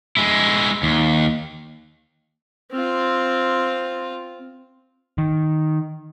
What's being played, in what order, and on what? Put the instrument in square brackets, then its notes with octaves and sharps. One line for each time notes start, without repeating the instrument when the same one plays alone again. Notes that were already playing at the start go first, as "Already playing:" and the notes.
[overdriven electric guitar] G#3 E4
D#2
[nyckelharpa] C4 F4
[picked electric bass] D#3